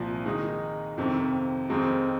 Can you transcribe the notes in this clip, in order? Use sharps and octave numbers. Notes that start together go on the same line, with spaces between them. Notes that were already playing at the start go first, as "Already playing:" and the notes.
Already playing: C2 A#2 F3
D#3 G#3 D#4
F2 C3 D#3
F2 D#3 G#3 C4 D#4